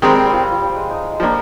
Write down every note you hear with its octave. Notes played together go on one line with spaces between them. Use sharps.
D#3 G3 G#3 C4
G3
F3
G3
F3
G3
G#3
D#4
G#3
F3 G3 A#3 D4